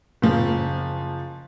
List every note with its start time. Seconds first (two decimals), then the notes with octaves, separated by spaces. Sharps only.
0.22 F#1 F3